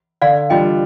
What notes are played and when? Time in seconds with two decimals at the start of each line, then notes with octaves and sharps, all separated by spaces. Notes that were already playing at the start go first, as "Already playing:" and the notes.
0.22 D3 D5 F5
0.50 G3 D4 F4 D#5 G5